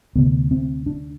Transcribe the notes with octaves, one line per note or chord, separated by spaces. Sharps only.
D2 C3 B3
C4
D4